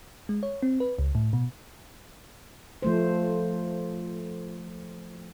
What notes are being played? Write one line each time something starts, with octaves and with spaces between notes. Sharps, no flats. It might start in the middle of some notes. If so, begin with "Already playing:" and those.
G#3
C#5
C4
B4
C#2
A2
B2
F3 A3 C5